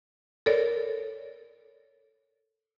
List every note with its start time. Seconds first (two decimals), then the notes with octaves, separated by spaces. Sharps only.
0.46 A4 A#4 C#5 D5